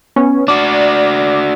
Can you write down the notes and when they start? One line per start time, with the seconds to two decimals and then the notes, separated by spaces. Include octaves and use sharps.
0.16 B3 C#4
0.48 D4 F#4 D5